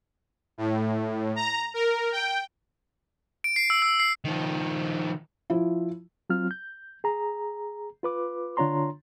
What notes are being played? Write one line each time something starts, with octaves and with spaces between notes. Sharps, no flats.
A2
A#5
A#4
G5
D7
C7
E6
E6
C7
D#3 F3
F3 E4
F#3 C4 F4 F6
G6
G#4 A#5
F4 B4 D6
D3 D4 F4 C#5 A#5 C6